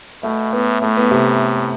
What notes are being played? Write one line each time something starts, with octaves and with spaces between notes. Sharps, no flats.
B2 A3
A2 B3
A2 A3
B3
C3